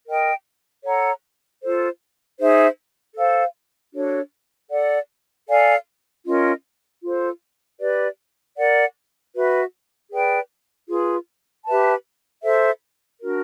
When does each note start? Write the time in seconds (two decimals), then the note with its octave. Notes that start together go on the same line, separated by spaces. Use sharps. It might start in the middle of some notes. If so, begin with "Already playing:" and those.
0.06 A#4 D#5 G5
0.83 A4 C#5 F#5 A#5
1.62 F4 A4 C5
2.38 D#4 G#4 C5 E5
3.16 A4 C5 F5
3.93 D4 F#4 A4 C#5
4.70 A4 D5 F#5
5.48 A4 D5 F5 G#5
6.26 C#4 F4 A#4 D#5
7.03 F4 A4 C5
7.79 G4 B4 D5
8.56 A#4 D5 F#5
9.35 F#4 B4 E5
10.12 G#4 B4 D5 G5
10.89 F4 G#4 B4
11.66 G4 B4 E5 A5
12.43 A4 C5 E5
13.21 D4 F#4 A#4